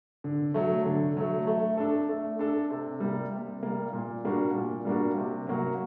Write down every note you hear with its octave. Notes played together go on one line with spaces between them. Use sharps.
D3
F#3 A3
D3
F#3 A3
A3
D4 A4
A3
D4 A4
C3
G3 A#3
C3
G3 A#3
A#2
G3 A#3 D4 F#4
A#2
G3 A#3 D4 F#4
C3
F#3 A#3 F#4